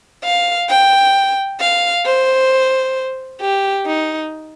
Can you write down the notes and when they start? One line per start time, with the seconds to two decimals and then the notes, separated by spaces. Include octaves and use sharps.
0.24 F5
0.69 G5
1.60 F5
2.05 C5
3.41 G4
3.86 D#4